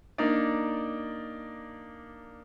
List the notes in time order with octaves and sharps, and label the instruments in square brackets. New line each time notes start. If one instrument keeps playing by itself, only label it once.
[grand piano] A#3 D4 D#4 D5